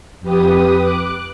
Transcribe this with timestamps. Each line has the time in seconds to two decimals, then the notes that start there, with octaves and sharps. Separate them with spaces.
0.21 F2 G4 B4 D#6
0.78 D6 F#6